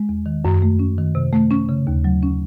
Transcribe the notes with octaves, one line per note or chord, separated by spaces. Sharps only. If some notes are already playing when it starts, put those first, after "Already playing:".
Already playing: G#3
E2
D#3
F#2
A3
C#4
D#3
C3
A3
C#4
C#3
D#2
F#3
C#4